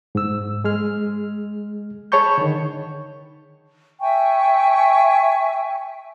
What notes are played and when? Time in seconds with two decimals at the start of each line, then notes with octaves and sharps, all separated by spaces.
0.15 G#2 E6
0.64 G#3 G#4 F6
2.12 G#4 C#5 A5 B5 C#6 G6
2.38 D3 D#3
4.00 E5 G5 G#5 C#6